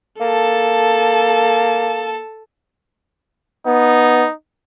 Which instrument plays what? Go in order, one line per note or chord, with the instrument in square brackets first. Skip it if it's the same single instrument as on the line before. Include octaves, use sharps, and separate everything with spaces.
[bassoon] A#3 [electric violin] A4 A5
[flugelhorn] B3 [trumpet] D#4